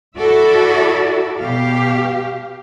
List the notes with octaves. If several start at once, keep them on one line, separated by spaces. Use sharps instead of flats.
E4 F#4 A4 D5 E5
B2 G4 F5